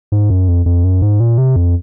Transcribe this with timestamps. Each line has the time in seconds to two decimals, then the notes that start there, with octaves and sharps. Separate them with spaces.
0.12 G#2
0.30 F#2
0.48 F2
0.66 F2
0.84 F#2
1.02 G#2
1.20 A#2
1.38 C3
1.56 F2